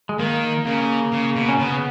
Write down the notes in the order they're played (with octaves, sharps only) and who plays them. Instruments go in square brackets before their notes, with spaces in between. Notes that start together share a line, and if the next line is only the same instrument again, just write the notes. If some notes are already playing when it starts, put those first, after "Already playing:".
[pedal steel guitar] G#3
[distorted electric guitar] D#3 [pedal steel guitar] A#3
[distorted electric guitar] C#3 [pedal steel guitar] A#3
[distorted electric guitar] C#3
B2
[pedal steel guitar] C#4
[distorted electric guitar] C#3 [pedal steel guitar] B3